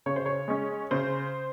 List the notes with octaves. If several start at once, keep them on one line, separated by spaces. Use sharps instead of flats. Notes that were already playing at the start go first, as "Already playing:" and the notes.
C#3 C#5
C5
C#5
G#3 C#4
C#3 C5